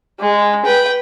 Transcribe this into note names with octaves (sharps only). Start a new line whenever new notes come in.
G#3
B4 G5